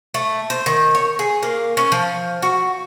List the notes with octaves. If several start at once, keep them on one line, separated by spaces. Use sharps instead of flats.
A3
C5
D#3
C#5
G#4
A#3
C#4
F3
F#4